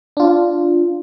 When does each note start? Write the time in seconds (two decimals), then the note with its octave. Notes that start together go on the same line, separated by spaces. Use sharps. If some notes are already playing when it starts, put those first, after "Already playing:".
0.17 D4 F4